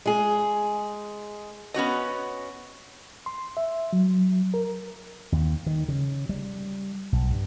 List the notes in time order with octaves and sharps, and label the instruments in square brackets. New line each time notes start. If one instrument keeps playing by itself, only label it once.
[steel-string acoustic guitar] G#3 G#4
[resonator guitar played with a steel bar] B3 C#4 F#4 D#5
[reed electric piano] C6
E5
F#3
A#4
[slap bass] D#2
D#3
C#3
G3
B1
G2